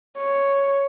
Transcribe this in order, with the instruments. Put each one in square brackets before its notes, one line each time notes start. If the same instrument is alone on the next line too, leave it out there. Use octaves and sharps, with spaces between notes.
[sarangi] C#5